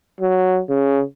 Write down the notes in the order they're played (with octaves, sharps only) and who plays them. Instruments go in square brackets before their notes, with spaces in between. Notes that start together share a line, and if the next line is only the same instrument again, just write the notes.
[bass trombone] F#3
C#3